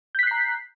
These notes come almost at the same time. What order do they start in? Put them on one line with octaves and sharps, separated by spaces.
G6 B6 F#6 C7 A#5